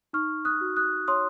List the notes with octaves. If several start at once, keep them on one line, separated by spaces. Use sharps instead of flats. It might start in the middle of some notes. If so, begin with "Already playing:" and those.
D#4 C#6 F6
D#6 F#6
F#4
D#6 F#6
C#5 C6 D#6